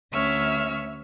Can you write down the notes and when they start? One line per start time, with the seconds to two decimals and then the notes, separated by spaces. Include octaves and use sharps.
0.12 D2 C#4 E5 C#6 E6 F6